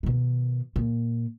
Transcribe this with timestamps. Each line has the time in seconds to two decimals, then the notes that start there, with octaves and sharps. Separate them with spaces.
0.03 B2 D#3
0.76 A#2